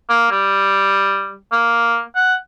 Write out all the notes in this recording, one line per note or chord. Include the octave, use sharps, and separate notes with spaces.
A#3
G3
A#3
F#5